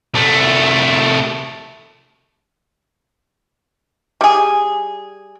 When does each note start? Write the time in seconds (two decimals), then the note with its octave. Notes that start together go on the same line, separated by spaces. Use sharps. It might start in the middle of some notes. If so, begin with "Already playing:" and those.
0.14 C2 A3
4.21 G3 G#4